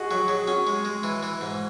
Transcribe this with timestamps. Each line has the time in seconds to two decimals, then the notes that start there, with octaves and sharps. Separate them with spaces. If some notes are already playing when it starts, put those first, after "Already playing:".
Already playing: F#4 G#4 D#5
0.10 F#3 F#4
0.28 F#3 G#4
0.47 C#4 F#4
0.67 G#3
0.85 G#3
1.03 E3
1.23 E3
1.41 G#2